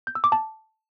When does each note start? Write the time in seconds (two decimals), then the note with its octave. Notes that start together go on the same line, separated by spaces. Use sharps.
0.07 G6
0.15 E6
0.24 D6
0.32 A5